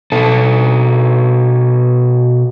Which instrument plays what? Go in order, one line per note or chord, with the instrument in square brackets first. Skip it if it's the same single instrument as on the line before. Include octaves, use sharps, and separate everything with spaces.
[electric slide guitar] B2 A4